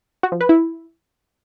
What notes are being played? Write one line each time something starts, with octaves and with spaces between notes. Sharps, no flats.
F#4
F3
B4
E4